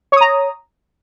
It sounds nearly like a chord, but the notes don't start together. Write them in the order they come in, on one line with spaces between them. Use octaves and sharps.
C#5 D#6 A#5